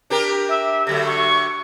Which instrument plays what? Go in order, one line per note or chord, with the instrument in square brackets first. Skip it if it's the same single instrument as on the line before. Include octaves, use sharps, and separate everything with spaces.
[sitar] D4 G4 A#4
[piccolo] E5
[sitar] D3 F#3 A3 [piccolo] A#6
[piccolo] C#6